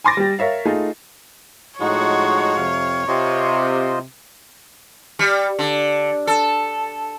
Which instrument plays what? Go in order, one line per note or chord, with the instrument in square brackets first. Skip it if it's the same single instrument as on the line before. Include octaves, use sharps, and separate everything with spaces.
[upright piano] G#5 B5 C6 D6 A6 A#6
G3 G4
A#4 C#5 E5 F5
A3 D#4 F4 G#4
[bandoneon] A2 D#4 [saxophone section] F3 G#3 F#4 [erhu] C#5
[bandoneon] F2 C3 F5
[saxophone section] C3 [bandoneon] F4 C5 D#5
[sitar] G3
D3
A4